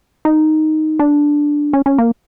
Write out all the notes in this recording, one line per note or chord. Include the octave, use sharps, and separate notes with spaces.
D#4
D4
C#4
C#4
A#3